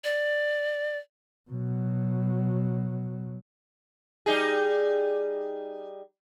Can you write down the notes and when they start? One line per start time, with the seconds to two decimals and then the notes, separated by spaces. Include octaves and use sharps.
0.04 D5
1.50 B2 F#3
4.26 G3 D#4 G#4